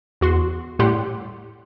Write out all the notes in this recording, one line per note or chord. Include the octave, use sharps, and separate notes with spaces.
E2 F#4 C6
A2 G3 G4 F#5 C6